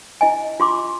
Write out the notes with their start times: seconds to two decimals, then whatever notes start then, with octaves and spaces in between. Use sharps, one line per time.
0.21 E4 D#5 G#5
0.60 F4 C6 D6